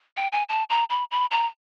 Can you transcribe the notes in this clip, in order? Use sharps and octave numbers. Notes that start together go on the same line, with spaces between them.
G5
G#5
A5
A#5
B5
B5
A#5